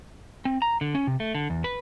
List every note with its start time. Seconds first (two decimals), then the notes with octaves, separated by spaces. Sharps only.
0.45 C4
0.62 A#5
0.81 D3
0.95 C#4
1.07 C3
1.20 A3
1.35 D3
1.50 E2
1.64 B4